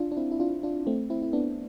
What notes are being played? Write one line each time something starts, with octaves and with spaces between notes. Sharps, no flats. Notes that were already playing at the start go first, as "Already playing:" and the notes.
Already playing: D4 F4
D4
C4 E4
E4
D4 F4
D4 F4
A3 C4
C4 E4
E4
B3 D4